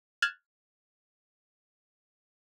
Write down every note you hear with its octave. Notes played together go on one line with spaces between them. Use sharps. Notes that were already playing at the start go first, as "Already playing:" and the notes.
F6 F#6 G#6 A6 E7